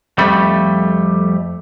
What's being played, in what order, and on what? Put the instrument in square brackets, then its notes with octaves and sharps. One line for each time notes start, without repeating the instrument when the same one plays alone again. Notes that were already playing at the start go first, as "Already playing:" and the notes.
[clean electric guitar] F2 G3 A3